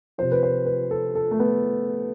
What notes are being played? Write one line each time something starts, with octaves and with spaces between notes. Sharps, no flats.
C3 F3 C5
B4
C5
B4
A4
A4
A3
B3